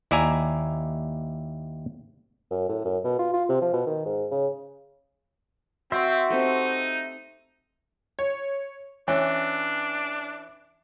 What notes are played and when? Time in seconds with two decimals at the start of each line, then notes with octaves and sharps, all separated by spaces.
0.11 D#2 E4 D5 E5 G#5 A#5
2.51 F#2
2.69 A2
2.85 F#2
3.04 B2
3.19 F4
3.34 F4
3.49 C3
3.62 F3
3.73 B2
3.86 D#3
4.06 G#2
4.31 C#3
5.92 C4 F#4 E5 C6 E6
6.30 A3 C4 D#4 G4
8.19 C#5
9.08 E3 C#4 D4